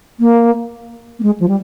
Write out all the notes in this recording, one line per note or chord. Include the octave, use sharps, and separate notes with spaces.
A#3
A#3
G#3
F3
G3